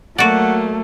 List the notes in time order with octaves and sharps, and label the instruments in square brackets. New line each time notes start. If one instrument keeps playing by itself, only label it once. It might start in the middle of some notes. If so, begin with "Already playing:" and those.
[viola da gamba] F#3 A#3 [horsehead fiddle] A3 [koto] F#4 D5 [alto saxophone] F#5